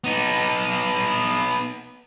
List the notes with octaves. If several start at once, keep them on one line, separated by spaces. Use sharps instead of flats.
B3 D#4